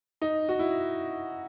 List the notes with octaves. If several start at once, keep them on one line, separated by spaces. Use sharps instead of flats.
D#4
F#4
E4